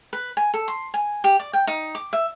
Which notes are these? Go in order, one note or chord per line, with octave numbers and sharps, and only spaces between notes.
B4
G#5
A4
C6
G#5
G4
D5
G5
D#4
D6
E5